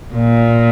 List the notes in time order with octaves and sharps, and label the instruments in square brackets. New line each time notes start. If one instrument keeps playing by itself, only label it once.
[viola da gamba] A#2